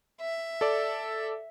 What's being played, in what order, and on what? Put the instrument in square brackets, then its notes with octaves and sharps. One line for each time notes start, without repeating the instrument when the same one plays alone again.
[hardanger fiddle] E5
[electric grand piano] A4 D5